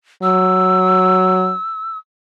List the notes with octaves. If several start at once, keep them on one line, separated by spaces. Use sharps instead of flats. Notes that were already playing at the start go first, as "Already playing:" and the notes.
F#3 E6